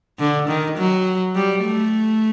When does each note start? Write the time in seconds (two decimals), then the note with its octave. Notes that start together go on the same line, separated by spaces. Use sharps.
0.19 D3
0.48 D#3
0.78 F#3
1.35 G3
1.64 A3